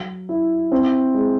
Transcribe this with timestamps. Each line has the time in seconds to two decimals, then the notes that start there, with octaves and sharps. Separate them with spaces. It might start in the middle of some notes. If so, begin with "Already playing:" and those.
Already playing: F#3
0.29 E4
0.72 C4
1.14 G#3